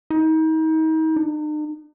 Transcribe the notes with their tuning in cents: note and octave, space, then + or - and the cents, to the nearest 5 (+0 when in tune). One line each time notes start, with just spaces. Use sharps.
D#4 +35
D#4 -45